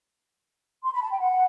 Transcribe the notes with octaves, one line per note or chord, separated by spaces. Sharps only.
C6
B5
A5
G5
F#5